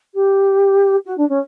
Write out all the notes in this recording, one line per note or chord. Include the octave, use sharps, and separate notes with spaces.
G4
F#4
D4
C#4